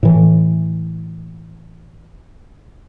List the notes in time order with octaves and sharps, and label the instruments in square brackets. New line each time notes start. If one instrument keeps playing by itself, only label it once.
[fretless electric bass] A2 E3